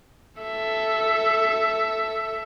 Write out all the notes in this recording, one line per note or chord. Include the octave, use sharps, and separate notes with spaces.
A4 E5